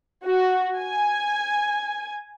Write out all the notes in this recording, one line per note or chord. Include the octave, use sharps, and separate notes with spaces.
F#4
G#5